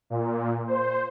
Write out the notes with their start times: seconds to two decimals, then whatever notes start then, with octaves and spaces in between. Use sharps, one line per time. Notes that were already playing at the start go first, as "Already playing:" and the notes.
0.10 A#2
0.68 C5